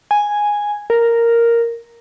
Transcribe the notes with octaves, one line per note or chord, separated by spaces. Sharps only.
G#5
A#4